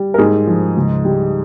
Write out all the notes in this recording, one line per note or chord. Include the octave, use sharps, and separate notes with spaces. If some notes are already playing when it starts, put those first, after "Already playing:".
Already playing: G3
A#4
G#2 G#4
F3
C#2
G3